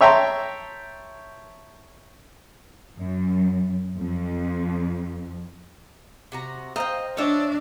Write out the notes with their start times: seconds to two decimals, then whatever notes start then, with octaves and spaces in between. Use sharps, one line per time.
0.01 C#5 E5 G5 A5 A#5 C6
2.96 F#2
3.97 F2
6.32 C3 F#4 A#5
6.76 C5 D#5 F5 G5 A#5
7.17 F3 D4 C#5 D#5 E5